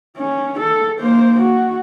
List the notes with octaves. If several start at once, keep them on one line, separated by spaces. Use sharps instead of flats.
C#4
A4
A#3 C5
F#4